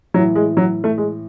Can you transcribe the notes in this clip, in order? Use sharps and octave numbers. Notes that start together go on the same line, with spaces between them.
A2 E3 F#3
G#3
F#3
A3
G#3